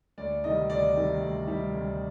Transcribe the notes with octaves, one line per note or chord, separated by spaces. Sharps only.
D2 D5
C3 D#3 G3 D#5
D2 D5
C3 D#3 G3
D2
C3 D#3 G3
D2